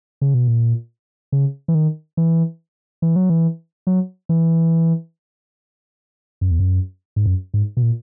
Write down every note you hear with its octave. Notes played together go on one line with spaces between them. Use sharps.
C#3
B2
A#2
C#3
E3
D#3
E3
E3
F#3
E3
F#3
E3
F#2
E2
F#2
G#2
F#2
G#2
B2
A#2